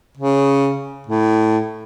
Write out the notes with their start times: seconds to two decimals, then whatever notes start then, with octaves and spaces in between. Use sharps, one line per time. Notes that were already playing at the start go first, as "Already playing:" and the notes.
0.17 C#3
1.07 A2